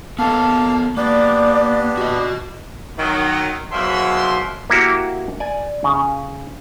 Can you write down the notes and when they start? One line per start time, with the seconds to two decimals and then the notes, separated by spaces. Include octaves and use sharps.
0.19 A#3 B3 A4 F5 A5
0.97 A#3 B3 D4 G4 D5
1.98 F#4 D#5
2.97 D#3 F#3
3.72 G#2 B2 F#3 A#3 E5 C6
4.70 A#3 E4 F#4 G4
5.40 D5 G#5
5.84 C#3